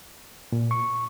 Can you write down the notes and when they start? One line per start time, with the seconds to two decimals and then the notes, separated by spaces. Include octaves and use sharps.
0.52 A#2
0.71 C#6